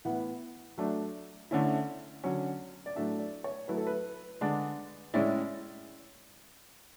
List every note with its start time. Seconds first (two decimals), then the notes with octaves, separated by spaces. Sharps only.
0.05 A2 E3 B3 F#5
0.78 F#3 A3 D4
1.51 D3 A3 C#4 E4
2.24 D3 F#3 C#4
2.86 D5
2.96 A2 F#3 A3 D4 E5
3.19 D5
3.44 C#5
3.68 F#3 A3 E4 B4
3.77 A4
3.87 B4
4.41 D3 G#3 D4
5.14 A2 G#3 C#4 E4 D5